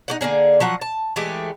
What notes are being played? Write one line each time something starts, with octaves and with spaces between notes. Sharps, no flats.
D#4 G4 F#5
D3 A#3 C#4 G#4
F3 F#3 F#5
A5
E3 G#3 A3 G4